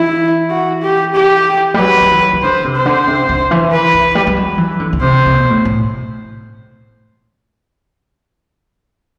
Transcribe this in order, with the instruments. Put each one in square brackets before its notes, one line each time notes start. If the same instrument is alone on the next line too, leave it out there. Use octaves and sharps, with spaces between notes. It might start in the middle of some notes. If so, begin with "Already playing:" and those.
Already playing: [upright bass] E3 [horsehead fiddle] E4
[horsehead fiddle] F#4
G4
G4
[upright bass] G3
[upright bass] F#3 [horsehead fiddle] B4
[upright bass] F#3
E3
E3
[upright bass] D3 [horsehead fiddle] C5
[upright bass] C3
[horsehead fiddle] C5
[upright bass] D3
C3
D3
E3
[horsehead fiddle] B4
[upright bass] E3
G3
G3
F#3
E3
D3
D3
[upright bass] C3 [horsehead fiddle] C5
[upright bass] C3
B2
A2
A2